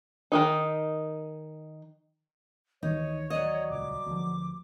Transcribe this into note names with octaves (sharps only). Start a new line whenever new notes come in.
D#3 E3 D#4
D2 D#3 E3 D#4 C#5
F#3 D5 D#5
D#1 C#2 D6
D2 F3